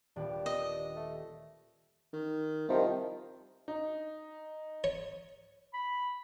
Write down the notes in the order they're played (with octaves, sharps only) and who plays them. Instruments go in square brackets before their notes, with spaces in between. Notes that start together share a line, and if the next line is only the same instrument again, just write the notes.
[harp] D#1 G4 B4 [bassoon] D4
[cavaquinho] D#5
[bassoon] A3
[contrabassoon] D#3
[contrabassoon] C2 [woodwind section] C3 D#3 F3
[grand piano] D#4
[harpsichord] C#5
[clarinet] B5